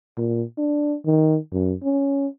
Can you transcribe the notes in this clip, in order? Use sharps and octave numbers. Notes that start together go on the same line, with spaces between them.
A#2
D4
D#3
F#2
C#4